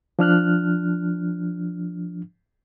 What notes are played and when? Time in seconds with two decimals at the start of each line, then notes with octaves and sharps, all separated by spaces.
0.19 F3 D4 F6 F#6